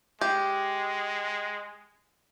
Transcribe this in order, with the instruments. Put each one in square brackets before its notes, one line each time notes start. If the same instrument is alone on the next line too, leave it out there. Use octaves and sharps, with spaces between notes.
[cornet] G#3 [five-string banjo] G4